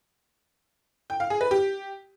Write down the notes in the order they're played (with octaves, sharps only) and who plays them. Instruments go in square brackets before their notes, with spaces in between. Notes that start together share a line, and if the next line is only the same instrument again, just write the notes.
[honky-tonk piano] G5
F5
G#4
B4
G4